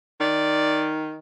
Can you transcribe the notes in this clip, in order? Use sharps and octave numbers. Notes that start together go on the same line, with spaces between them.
D#3 D5